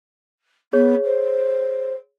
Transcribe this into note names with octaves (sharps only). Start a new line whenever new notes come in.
B3 G#4 C#5
C5